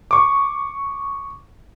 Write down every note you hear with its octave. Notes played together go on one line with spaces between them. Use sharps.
C#6 D6